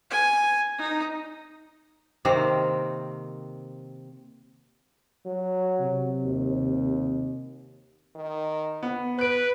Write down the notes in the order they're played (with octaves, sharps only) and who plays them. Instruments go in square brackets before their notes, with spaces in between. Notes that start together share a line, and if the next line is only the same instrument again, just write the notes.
[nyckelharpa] G#5
D#4
[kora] C3 D#3 A#3 C4
[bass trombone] F#3
[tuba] C3
[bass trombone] D#2
[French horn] D#3
[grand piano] B3
[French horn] B4 [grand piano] F#6 D7